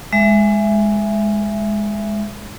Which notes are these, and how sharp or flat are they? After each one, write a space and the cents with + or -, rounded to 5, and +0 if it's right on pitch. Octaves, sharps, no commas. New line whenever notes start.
G#3 +0 E5 +15